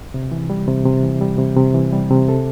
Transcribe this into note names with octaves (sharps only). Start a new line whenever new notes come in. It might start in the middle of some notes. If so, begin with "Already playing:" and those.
C3
E3
G3
C3
C3
E3
G3
C3
C3
E3
G3
C3
A4